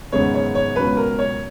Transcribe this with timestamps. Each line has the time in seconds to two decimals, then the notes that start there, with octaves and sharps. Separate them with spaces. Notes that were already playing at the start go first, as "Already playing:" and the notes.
0.12 G#1 F#2 C#3 G#3 B3 C#5
0.34 C#5
0.55 C#5
0.76 C#2 B2 F#3 C#4 B4
0.97 A#4
1.19 C#5